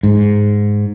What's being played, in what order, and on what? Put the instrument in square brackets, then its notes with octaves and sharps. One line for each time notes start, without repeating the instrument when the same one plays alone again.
[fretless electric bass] G#2